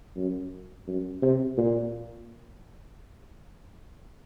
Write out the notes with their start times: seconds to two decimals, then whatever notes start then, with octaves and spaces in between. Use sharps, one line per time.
0.16 F#2
0.88 F#2
1.22 C3
1.57 A#2